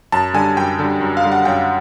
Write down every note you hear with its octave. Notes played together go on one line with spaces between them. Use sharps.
F#2 A5
D3 G3 G#5
F#2 G5
D3 G3
F#2
F5
D3 G3
F#5
F#2 G5